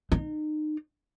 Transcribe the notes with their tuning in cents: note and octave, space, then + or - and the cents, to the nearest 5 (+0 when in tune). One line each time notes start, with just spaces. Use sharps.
D#4 -30